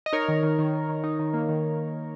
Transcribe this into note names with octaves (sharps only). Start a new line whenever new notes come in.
D#5
D#4 A#4 C#5
D#3
D#3
D#3
D#3
D#3
D#4
D#3
A#3
D#3